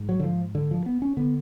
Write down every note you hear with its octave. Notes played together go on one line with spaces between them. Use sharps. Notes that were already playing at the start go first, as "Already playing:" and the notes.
Already playing: G#2
F#3
D3
F3
D3
F3
B3
C#4
D3 B3